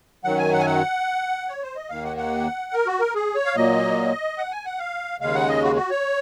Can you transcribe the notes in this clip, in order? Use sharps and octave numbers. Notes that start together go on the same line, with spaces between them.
F#2 D#3 F#3 F#5
G#5
F#5
G#5
F#5
C#5
C5
D#5
D#2 D#3 A#3 F5
F#5
F#5
A#4
F#4
A#4
G#4
C#5
F5
A#2 F#3 A#3 D#5
F#5
G#5
F#5
F5
D#2 C#3 G#3 F5
F#5
D#5
F#4
F#4
C#5